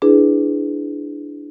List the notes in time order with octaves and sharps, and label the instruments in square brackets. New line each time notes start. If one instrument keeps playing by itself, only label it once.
[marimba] D4 E4 G#4 B4